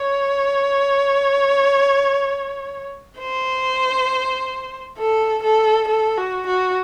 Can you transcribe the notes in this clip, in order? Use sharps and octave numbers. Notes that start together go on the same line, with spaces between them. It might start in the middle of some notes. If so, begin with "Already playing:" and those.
Already playing: C#5
C5
A4
A4
A4
F#4
F#4